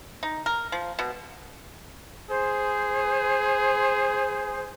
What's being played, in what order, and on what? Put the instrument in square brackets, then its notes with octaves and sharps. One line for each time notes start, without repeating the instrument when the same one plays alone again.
[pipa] D#4
A#4
F3
B2
[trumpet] G#4 [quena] C5